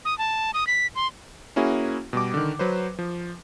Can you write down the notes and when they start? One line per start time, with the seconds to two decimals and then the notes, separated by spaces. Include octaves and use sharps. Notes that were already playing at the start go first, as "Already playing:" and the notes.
0.05 D#6
0.18 A5
0.54 D#6
0.67 B6
0.95 C6
1.56 A#3 C#4 E4 F#4 G#4
2.13 B2 G3 D6
2.34 D3 D#3
2.59 F#3 B4 C5
2.99 F3